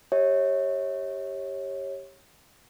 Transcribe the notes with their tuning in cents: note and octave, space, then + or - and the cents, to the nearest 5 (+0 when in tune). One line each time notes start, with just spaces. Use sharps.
G4 +0 C#5 -20 E5 -45